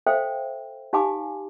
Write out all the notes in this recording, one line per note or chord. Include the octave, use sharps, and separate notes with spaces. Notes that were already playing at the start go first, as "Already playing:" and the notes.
A4 C5 E5 F5 G5
D#4 G4 F5 G#5 B5 D6